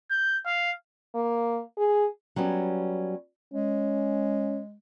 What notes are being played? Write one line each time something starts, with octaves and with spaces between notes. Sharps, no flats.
G6
F5
A#3
G#4
F#3 G3 B3 C#4
G#3 C#4